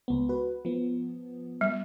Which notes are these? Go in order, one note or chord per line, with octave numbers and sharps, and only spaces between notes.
C#2 B3
F#4 B4
F3 B3
G3